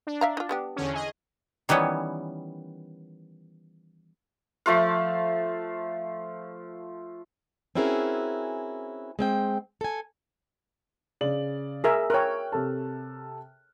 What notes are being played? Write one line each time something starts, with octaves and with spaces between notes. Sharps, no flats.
D4
E5 F5 A#5
D#4 F4
G3 B3 G4
E2 D3 C#4
G#4 D#5
D#3 E3 G3 B3 C#4
F3 A3 F4 F5
C4 C#4 E4 F#4 G#4 A#4
G#3 C4 G5
A4 G#5
C#3 D5 F#7
G#4 A#4 E5
A#4 C#5 G5 F6 F#6
C3 A4 A5